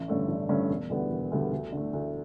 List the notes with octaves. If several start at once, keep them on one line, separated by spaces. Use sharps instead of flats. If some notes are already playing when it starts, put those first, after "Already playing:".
Already playing: A1
G2 D3 A3 C#4
A1
G2 D3 A3 C#4
E1
D2 D3 G3 B3
E1
D2 D3 G3 B3
D2
D3 A3
D2